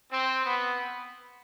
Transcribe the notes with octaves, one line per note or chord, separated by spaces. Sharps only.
C4
B3